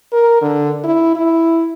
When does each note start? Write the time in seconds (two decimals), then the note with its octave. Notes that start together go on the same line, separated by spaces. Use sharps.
0.12 A#4
0.42 D3
0.84 E4
1.15 E4